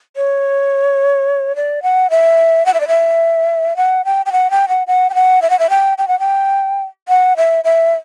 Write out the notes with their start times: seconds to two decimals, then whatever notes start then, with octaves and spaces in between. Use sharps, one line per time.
0.16 C#5
1.56 D5
1.83 F#5
2.10 E5
2.66 F#5
2.74 E5
2.80 D5
2.88 E5
3.76 F#5
4.05 G5
4.26 G5
4.32 F#5
4.50 G5
4.68 F#5
4.87 F#5
5.10 G5
5.15 F#5
5.42 E5
5.50 F#5
5.59 E5
5.70 G5
5.98 G5
6.08 F#5
6.19 G5
7.08 F#5
7.37 E5
7.64 E5